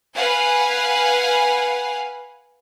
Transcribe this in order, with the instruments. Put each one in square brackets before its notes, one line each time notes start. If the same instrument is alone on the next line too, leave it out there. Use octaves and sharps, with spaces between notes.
[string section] B4 F5 F#5 G#5